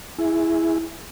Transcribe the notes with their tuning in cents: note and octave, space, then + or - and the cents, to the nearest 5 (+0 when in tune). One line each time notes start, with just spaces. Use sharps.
E4 +0 G#4 +0